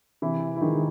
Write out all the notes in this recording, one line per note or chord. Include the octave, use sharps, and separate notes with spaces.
C3 E3 E4
E4
D#3 F3 G#3 D#4